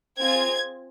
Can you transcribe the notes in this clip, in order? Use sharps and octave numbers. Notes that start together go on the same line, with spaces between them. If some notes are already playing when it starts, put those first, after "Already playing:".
C4 F4 G#4 G#6